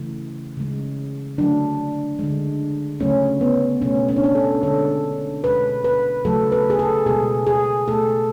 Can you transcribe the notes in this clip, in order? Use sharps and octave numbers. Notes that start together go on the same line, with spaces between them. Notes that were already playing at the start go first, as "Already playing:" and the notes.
Already playing: C#3 E3 A3
C#3 G#3
D3 F#3 A3 D4
D3 G#3
C#3 F#3 A3 C#4
B3
B2 A3 C#4
C#4
D4
C#4
A4
D3 G#3 A4
B2 G#3 B4
B4
C#3 F#3 A3 A4
B4
G#4
A4
B2 G#3 G#4
G#4
B2 A3 A4